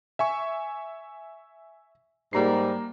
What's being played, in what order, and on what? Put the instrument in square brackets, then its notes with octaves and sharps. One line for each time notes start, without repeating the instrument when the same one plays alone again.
[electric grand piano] E5 G#5 C#6
[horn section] G#2 G3 [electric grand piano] A#3 A#5 C7